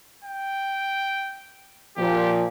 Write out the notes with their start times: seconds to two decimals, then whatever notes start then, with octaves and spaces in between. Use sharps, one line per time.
0.24 G5
1.97 A#2 F3 G4